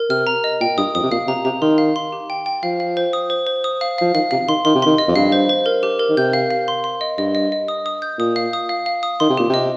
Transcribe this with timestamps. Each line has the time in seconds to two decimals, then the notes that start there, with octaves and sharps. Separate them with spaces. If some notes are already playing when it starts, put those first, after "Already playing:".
Already playing: A#4
0.10 C3 F6
0.27 A#5
0.44 D#5
0.60 A#2 G5
0.77 G2 D#6
0.95 F2 D#6
1.03 C3
1.11 A#2 F5
1.27 C3 A#5
1.45 C3 A#5
1.62 D#3 C6
1.78 F5
1.96 C6
2.12 G4
2.30 G5
2.46 G5
2.63 F3 F5
2.80 F5
2.97 C5
3.13 D#6
3.30 C5
3.47 C5
3.64 D#6
3.81 F5
3.98 F3 F5
4.14 D#3 F5
4.31 C3 F5
4.48 D#3 C6
4.65 D#3 C6
4.75 C3
4.82 D#3 C6
4.98 D#5
5.08 F2
5.16 G2 F5
5.32 C5
5.49 C5
5.66 A#4
5.83 G4
5.99 A#4
6.09 D#3
6.17 C3 G6
6.33 F5
6.51 F5
6.68 C6
6.84 C6
7.01 D#5
7.18 G2 D#5
7.35 D#5
7.52 D#5
7.68 D#6
7.86 D#6
8.02 G6
8.19 A#2 D#6
8.36 F5
8.53 D#6
8.69 F5
8.86 F5
9.03 D#6
9.20 D#3 C6
9.30 C3
9.37 A#2 G4
9.50 C3 D#5